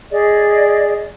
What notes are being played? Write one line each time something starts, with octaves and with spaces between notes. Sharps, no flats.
G#4 D5 D#5